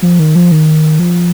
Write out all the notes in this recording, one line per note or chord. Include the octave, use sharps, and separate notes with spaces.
F3
D#3
F3
D#3
F3